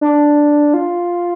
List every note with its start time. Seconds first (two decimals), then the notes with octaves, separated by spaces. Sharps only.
0.01 D4
0.74 F4